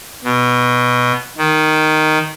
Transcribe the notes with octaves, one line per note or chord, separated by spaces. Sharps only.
B2
D#3